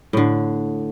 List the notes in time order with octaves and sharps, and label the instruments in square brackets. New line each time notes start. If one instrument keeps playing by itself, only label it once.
[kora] A2 D3